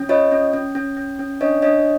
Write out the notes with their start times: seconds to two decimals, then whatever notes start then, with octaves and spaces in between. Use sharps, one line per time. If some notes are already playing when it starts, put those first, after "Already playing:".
Already playing: C#4
0.09 F4 C#5 D#5
0.32 C#4
0.53 C#4
0.75 C#4
0.97 C#4
1.19 C#4
1.41 D4 C#5 D#5
1.62 D4 C#5 D#5